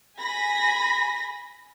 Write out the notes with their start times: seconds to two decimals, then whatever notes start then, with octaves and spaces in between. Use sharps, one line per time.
0.18 G#5 B5 A#6 B6